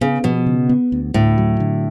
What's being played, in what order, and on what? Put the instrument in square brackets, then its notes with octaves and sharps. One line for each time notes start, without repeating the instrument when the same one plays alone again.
[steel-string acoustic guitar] C#3 [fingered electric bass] B3
[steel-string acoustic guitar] B2 [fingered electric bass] F3
[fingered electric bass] C#3
B3
D2
[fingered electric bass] D2 [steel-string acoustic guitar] A2
[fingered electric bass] F#3
D3